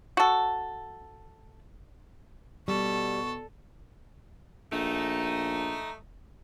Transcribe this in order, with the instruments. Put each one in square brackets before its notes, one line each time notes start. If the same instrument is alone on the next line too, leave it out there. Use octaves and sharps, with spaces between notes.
[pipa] F#4 A4
[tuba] B2 [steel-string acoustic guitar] G3 [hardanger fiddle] A4 [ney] C#6
[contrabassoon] A#1 [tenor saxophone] A3 [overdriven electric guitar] D#4